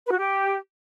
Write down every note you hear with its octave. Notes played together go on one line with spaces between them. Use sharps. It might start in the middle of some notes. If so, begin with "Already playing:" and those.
B4
F#4
G4